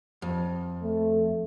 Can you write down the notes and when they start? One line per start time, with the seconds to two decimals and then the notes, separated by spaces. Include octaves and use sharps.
0.22 F2
0.83 A3